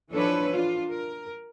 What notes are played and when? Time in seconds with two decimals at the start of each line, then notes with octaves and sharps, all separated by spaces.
0.11 E3 F3 D4 A4 B4 C#5
0.51 D4 F4
0.88 A#4